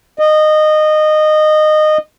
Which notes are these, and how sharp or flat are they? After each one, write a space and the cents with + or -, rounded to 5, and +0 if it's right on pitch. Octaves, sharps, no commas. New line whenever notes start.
D#5 -20